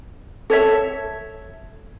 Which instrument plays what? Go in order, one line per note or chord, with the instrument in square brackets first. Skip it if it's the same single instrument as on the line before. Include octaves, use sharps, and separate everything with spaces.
[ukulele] A4 C#5 E5